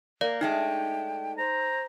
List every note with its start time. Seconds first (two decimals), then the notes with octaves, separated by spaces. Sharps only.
0.21 A#3 D5
0.41 G#3 A3 D4 D#4 G5
1.38 C5 A#5